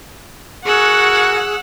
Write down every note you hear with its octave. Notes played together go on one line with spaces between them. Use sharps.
F#4 G#4 A#4 F#5 C#6 E6 F#6